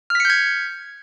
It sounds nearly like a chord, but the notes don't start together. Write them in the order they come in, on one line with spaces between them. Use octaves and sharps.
F6 B6 C#7 G6 G#6